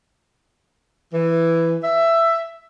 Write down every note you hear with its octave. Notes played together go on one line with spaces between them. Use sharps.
E3
E5